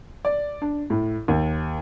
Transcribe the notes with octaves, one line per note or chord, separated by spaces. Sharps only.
D5
D4
A2
D#2